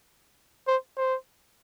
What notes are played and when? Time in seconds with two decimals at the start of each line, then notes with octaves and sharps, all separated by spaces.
0.67 C5
0.97 C5